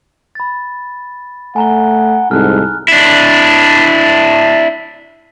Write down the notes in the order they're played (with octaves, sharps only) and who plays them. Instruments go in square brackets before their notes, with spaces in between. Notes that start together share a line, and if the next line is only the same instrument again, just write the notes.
[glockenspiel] B5 A6
[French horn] A3 [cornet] F#5 [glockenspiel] G#5 A#5 G7
[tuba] C2 [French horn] G#2 [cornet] A4 [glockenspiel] F6 F#6
[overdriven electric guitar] D4 E4